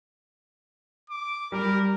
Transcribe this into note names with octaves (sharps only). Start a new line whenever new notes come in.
D6
G3 A#4